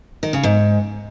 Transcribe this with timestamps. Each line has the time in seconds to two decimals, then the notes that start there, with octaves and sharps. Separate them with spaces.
0.23 D#3
0.33 C#3
0.43 G#2